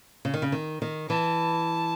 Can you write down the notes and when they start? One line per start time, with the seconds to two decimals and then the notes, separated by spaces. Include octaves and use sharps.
0.25 C#3
0.34 D#3
0.42 C#3
0.52 D#3
0.82 D#3
1.09 E3 A5